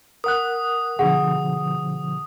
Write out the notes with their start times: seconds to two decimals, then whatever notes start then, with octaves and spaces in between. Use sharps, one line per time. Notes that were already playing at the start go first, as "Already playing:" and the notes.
0.24 A#4 F#5 D#6 F#6
0.99 B2 D3 F3 G#4 F#5